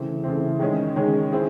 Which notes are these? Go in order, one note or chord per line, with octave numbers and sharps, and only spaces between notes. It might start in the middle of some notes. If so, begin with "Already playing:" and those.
Already playing: C#3 E3 A3 C4
C#3 E3 A3 C4
D#3 G#3 C#4 G#4
D#3 G#3 C#4 G#4
C4 E4 G#4